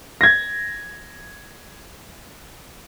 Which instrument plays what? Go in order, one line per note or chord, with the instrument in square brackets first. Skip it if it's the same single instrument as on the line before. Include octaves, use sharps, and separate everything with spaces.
[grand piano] G#6 A#6